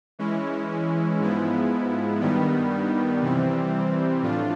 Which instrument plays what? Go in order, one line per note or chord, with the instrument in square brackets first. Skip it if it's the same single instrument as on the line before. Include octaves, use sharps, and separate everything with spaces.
[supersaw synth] E3 G#3 C#4 E4
G#2 F3 G#3 B3 E4
G2 D#3 G3 B3
C3 E3 G3 C4
A2 F3 A3 D4 F4